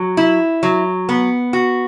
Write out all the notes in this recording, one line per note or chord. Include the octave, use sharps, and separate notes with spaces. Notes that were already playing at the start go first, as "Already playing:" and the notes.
Already playing: F#3
E4
F#3
B3
F#4